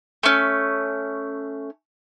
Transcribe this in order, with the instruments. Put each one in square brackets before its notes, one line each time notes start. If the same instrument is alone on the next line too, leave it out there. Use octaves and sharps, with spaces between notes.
[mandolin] A3 C#4